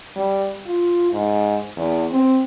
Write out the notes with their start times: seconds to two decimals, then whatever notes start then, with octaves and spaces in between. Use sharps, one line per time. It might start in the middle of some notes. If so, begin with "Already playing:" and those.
0.16 G3
0.66 F4
1.12 G#2
1.76 E2
2.11 C4